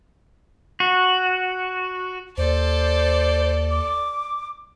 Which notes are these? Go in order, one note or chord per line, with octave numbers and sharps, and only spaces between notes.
F#4
D#2 A4 C5 D5
D6